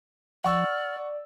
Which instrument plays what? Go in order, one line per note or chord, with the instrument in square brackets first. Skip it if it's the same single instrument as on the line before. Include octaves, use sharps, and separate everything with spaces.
[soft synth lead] F3 [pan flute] D5 [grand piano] F#5 C#6 E6
[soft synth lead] F6
D5